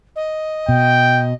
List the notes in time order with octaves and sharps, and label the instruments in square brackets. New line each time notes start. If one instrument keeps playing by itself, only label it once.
[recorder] D#5
[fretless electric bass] B2 [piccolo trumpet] G5